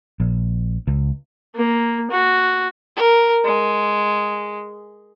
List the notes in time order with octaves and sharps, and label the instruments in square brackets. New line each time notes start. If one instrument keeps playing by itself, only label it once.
[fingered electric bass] A#1
C#2
[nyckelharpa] A#3
F#4
[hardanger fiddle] A#4
G#3